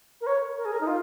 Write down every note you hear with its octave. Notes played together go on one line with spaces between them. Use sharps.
A#4
C#5
A#4
G#4
A#4
D#4
F4